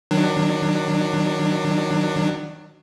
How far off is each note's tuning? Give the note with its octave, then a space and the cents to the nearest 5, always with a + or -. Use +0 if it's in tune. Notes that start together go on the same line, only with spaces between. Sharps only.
D#3 +0 F#3 +0 D4 +20